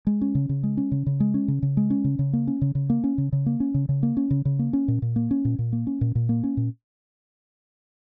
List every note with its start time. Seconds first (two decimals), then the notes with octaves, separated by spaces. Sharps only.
0.07 G#3
0.21 C#4
0.35 C#3
0.49 C#3
0.63 G#3
0.77 C#4
0.92 C#3
1.06 C#3
1.20 G#3
1.34 C#4
1.48 C#3
1.62 C#3
1.77 G#3
1.90 C#4
2.04 C#3
2.19 C#3
2.33 A#3
2.47 C#4
2.62 C#3
2.75 C#3
2.90 A#3
3.04 C#4
3.18 C#3
3.32 C#3
3.46 A#3
3.60 C#4
3.74 C#3
3.89 C#3
4.03 A#3
4.17 C#4
4.30 C#3
4.45 C#3
4.59 A#3
4.73 C#4
4.88 A#2
5.02 A#2
5.16 A#3
5.31 C#4
5.45 A#2
5.59 A#2
5.73 A#3
5.87 C#4
6.01 A#2
6.15 A#2
6.29 A#3
6.43 C#4
6.57 A#2